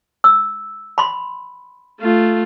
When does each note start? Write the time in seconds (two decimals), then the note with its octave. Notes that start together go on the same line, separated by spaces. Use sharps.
0.24 E6
0.98 B5 C6
2.01 A3 F4